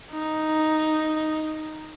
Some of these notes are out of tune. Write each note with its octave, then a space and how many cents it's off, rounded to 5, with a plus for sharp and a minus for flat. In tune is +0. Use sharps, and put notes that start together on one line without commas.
D#4 +0